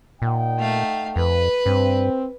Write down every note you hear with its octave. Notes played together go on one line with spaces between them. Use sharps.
A#2 D#4 F#5 G5
A3 F5
F2 B4
G2 C4